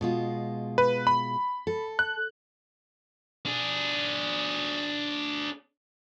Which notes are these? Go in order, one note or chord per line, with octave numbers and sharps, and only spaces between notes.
B2 G#3 F4
B4
B5
A4
F#6
D4 G#4